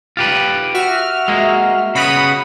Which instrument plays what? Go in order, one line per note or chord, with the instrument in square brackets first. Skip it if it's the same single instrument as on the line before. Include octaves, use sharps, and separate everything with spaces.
[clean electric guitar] F4 G4 B4
[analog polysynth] F#4 E5 F6
[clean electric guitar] G#3 A#3
[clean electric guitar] C#3 F#4 B4 [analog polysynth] B5 D#6